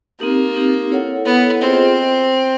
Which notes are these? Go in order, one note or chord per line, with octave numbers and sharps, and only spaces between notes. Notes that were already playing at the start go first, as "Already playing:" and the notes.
A#3 C4 D#4 G4
C4 D#4 G4
E4 A4 C#5 F#5
B3 E4 A4 C#5 F#5
C4 F4 G#4 C5 D#5